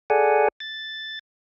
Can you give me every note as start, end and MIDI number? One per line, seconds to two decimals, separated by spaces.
0.10 0.48 68
0.10 0.48 69
0.10 0.48 74
0.10 0.48 78
0.10 0.48 80
0.60 1.19 93